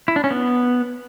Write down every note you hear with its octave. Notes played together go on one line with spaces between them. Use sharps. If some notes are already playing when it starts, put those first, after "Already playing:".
E4
D4
C#4
B3